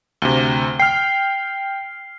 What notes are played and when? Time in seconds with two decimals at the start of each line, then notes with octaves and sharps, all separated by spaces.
0.22 D2 C3 G7
0.80 G5 F6 C7